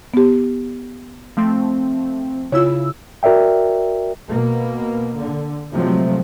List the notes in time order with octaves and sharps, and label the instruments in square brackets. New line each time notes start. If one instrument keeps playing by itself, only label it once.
[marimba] B3 G4
[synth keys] F3 A3 C4
[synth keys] C#3 E4 E6 [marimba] F4 C#5
[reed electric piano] F#4 A#4 D5 E5 G5
[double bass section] B2 A#3
D3
C3 F3 F#3 G#3 A3 C4